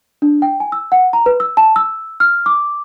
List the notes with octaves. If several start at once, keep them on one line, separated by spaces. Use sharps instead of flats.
D4
G5
G#5
E6
F#5
A#5
B4
E6
A5
E6
F6
D6